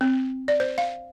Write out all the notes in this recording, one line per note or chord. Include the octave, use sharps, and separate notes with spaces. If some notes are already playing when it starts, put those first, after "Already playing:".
C4
D5
C5
F5